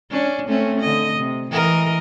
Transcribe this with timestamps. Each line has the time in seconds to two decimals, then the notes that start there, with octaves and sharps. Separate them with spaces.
0.11 C#4 D4
0.48 A3 C4 C#4
0.80 D3 D#5
1.18 C3
1.50 E3 A#4 D#5